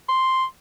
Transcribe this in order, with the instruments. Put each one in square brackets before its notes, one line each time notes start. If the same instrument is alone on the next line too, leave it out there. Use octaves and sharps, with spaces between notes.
[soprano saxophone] C6